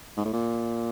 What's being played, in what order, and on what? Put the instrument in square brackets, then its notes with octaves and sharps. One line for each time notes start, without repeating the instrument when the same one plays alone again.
[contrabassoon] G#2
A2
A#2